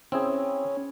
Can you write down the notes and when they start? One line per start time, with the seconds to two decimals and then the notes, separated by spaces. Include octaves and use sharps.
0.12 C4 C#4 E4 G#4